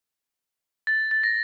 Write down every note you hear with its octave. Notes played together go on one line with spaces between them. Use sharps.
A6
A6
A#6